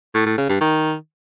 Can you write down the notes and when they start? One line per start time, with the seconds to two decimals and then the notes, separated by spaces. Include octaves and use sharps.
0.14 A2
0.26 A2
0.38 C#3
0.49 G2
0.61 D#3